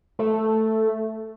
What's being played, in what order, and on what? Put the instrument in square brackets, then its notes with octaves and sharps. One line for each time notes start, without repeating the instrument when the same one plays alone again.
[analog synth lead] A3